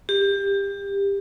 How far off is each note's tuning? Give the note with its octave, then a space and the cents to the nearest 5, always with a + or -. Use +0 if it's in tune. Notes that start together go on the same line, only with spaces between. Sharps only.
G4 +25